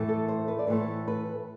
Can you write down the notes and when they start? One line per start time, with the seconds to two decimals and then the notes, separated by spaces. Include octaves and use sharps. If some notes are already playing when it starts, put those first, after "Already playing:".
Already playing: A2 E3 A3
0.09 A4
0.28 C5
0.48 B4
0.59 D5
0.67 A2 E3 A3 C5
1.08 B4